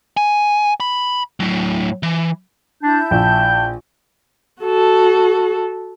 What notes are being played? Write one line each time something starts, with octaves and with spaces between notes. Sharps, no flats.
G#5
B5
A2 F#3
E3
D4 E4 A5 G6
A#1 G5
F#4 A4